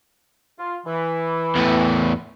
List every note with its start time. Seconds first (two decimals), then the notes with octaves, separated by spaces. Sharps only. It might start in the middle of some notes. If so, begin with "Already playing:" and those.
0.59 F4
0.86 E3
1.55 E2 A2